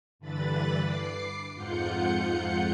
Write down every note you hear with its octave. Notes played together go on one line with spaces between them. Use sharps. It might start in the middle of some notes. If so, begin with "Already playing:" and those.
G2 D3 E3 B4 B5 A6
D6 C7
F2 G#2 F4 F#5 G6 C#7